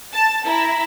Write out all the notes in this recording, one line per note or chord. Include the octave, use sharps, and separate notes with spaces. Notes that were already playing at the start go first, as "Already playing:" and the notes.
A5 A6
E4 A#5